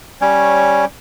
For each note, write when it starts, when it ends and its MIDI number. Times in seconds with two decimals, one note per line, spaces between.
0.21 0.85 55
0.21 0.85 61
0.21 0.85 73